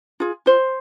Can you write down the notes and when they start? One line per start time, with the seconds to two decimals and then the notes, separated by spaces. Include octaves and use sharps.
0.20 F4 G#4
0.46 F4 C5